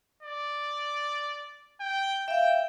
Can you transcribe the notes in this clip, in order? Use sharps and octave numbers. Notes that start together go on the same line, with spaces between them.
D5
G5
E5 F5 G5